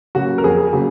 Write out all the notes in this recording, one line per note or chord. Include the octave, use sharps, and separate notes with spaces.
C#3 F#3 A#3 F#4
A#4
F2 G#4
C#3 F#3 A#3